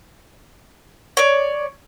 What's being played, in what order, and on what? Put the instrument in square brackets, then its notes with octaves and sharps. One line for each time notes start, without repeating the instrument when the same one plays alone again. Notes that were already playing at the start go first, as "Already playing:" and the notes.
[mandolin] C#5 D5